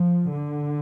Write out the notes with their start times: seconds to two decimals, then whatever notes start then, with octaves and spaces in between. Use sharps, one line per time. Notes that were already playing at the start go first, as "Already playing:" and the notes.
Already playing: F3
0.32 D3